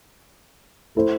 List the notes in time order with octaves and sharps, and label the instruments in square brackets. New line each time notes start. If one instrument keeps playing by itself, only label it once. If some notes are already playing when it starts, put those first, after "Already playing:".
[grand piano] A3 E4 A4 C5